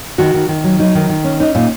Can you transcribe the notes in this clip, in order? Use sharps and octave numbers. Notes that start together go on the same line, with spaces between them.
D#3 F#4
D#3
D#3
F#3
F#3 D#4
D#3
D#3
C#4
C#4 D#4
A#2 D#4